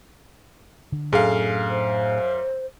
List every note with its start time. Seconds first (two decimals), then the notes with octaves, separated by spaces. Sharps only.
0.92 D3
1.13 F#2 A2 D4 G#4 A4 F5
1.69 C5